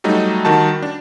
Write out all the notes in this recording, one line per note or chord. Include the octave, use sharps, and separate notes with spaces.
F#3 G3 A3 D#4
D#3 G3 F#4 A5
D4